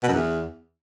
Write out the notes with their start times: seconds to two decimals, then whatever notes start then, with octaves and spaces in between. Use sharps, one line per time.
0.03 B2
0.08 F#2
0.13 E2